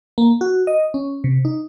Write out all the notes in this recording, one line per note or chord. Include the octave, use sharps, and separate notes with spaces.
A#3
F#4
D#5
C#4
C3
D#4